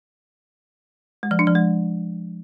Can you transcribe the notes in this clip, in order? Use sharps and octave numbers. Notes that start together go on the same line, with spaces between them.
G#3
F3
D4
F3
G#3